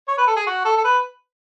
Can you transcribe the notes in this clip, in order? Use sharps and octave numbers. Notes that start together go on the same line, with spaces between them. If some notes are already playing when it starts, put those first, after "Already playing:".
C#5
B4
A4
G#4
F#4
A4
A4
B4